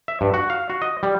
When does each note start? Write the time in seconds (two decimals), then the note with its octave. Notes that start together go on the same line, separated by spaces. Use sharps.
0.08 E5
0.21 G2
0.34 F#4
0.50 F5
0.70 F#4
0.82 D#5
1.03 G3